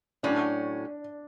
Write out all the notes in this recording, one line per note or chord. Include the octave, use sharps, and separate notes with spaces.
A2 F#3 C#4 D4